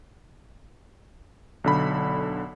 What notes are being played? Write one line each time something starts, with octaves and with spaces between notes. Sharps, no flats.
B1 D3 B5